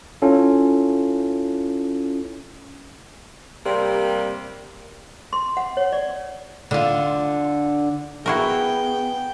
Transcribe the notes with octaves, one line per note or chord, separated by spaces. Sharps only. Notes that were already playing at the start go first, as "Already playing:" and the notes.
C#4 E4 F4 A4
C3 G3 A#3
C6
F#5
C#5
D5
D3 F4
B3 E4 F#4 G#4 A#4 G5